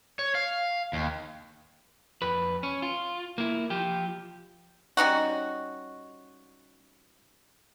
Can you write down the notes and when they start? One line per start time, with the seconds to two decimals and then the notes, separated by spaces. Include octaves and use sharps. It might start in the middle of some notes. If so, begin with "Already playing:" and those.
0.19 C#5
0.35 F5
0.93 D#2
2.22 F2 B4
2.63 C#4
2.82 F4
3.38 A#3 E4
3.70 F3 G4
4.97 G3 C#4 D#4 F#4